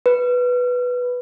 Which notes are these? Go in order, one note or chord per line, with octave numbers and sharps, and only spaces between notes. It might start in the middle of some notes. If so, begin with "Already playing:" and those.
B4